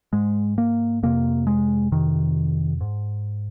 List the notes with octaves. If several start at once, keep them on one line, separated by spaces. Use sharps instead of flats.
G#2 G#3
A#3
F2 C3 A#3
G#3
F2 C3 D#3
G#2